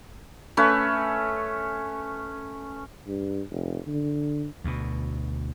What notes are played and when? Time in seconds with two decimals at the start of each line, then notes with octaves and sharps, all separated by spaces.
0.57 A3 C#4 B4
3.07 G2
3.51 F1
3.87 D3
4.64 D2 B2